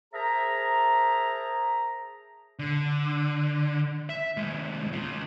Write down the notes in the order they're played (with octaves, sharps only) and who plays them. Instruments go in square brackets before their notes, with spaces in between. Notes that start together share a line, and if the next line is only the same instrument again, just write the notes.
[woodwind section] G#4 A#4 C5 E5 A5 A#5
[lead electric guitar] D3
E5
D#2 G#3
G#3 F4